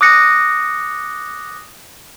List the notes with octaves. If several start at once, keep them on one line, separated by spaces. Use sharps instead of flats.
D6 D#6 F#6 A#6 C#7